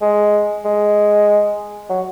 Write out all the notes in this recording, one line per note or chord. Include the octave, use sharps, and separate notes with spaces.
G#3
G#3
F#3